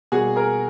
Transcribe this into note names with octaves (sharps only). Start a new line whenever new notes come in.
B2 G3 A#3 F#4 G#4
G#4 A#4